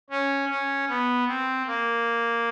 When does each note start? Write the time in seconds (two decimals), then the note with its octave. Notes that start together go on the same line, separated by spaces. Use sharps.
0.10 C#4
0.50 C#4
0.89 B3
1.27 C4
1.67 A#3